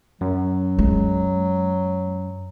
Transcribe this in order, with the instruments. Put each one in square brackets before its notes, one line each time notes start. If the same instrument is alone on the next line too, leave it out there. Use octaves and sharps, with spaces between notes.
[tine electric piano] F#2 [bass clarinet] F#3
[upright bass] G#3